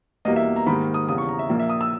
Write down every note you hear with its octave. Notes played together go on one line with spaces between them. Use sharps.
E2 B2 G3 A#3 D#5
E5
A#5
G#2 D#3 G3 A#3 B5
D#6
E2 C#3 G3 D#6
C#6
A#5
E5
A#1 A#2 A#3
E5
D#6
E6